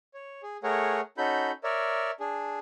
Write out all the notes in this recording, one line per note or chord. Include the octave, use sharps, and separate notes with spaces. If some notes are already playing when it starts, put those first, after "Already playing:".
C#5
G#4
A3 G#4 A#4 C#5 F#5
C#4 D#4 F#4 A4 B5 G6
A#4 C#5 D5 E5
D4 G#4